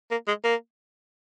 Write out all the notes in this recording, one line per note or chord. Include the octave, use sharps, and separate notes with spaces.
A#3
G#3
A#3